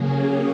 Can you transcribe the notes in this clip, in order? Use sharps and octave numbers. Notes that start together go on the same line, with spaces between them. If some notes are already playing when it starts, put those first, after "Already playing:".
Already playing: C#3 F#3 A#3 C#4 G#4
G4